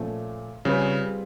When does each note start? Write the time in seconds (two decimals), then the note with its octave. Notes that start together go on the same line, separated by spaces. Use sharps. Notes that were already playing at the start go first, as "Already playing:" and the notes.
Already playing: A#2 F3 A3 C#4
0.65 C#3 G3 C4 F4 G#4 B4